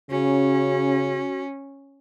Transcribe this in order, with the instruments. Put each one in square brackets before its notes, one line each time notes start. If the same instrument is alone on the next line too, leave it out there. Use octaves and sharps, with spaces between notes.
[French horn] C#3 [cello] C#4 [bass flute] F#4